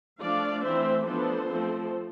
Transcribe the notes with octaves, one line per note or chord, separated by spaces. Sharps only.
F3 A3 D4 D5 F5
E3 A3 C4 C5 E5
F3 B3 D4 A4 C5
F3 A3 C4